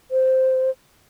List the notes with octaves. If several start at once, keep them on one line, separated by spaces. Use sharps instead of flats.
C5